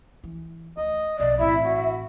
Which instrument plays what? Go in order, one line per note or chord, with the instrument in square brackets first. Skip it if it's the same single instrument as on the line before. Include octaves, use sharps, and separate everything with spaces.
[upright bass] E3
[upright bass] D2 [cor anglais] D#5
[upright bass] B1 F2 [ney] D5 [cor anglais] D#5
[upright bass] A1 C4 [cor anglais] E4 [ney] E5
[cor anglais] F#4